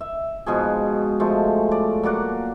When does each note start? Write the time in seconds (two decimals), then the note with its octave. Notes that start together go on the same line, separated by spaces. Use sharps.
0.01 E5
0.46 G#2 B2 F3 G#4
1.20 F3 G#3 A3
1.71 D5
2.03 F#3 A#3 D5 F#5